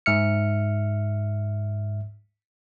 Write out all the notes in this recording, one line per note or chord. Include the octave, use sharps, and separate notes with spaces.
G#2 E5 F6 C#7